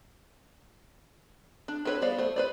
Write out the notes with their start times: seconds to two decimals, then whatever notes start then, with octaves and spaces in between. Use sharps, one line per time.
1.68 D4
1.85 C4 D4 B4 C#5
2.02 G3 B3 C5 D5 F5
2.18 A3 C5
2.36 B4 C5 D5